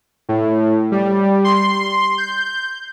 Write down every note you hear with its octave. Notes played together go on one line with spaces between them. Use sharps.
A2
G3
C6
G6